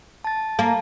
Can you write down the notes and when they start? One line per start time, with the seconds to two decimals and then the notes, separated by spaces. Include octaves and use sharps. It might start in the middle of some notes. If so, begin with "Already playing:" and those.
0.24 A5 A6
0.59 A#3 A5